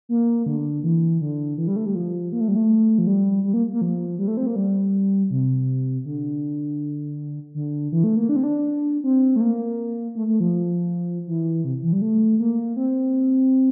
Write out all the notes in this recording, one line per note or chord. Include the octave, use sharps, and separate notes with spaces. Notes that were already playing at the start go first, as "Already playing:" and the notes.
A#3
D3
E3
D3
E3
G3
A3
G3
F3
A#3
A3
G3
A3
F3
G3
G3
A#3
A#3
F3
G3
A3
C4
A#3
G3
C3
D3
D3
E3
A3
A#3
D4
C4
D4
C4
A3
A#3
A3
A3
F3
E3
C3
E3
G3
A3
A#3
C4